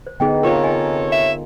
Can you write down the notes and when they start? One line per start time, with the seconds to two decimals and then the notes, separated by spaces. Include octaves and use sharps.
0.07 C5
0.20 D3 B3 D#4 G#4 D#5 G5
0.43 C3 F4 A4 A#4 C#5
0.64 D#5 G#5
1.12 E5